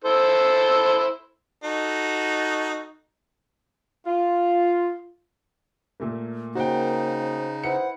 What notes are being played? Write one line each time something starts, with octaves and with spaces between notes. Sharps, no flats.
E4 A4 C5
D#4 F#4 A4
F4
A#2 A3 A#3
C#3 A#3 D#4 F#4 C5 G5
E4 B4 C5 F#5 C#7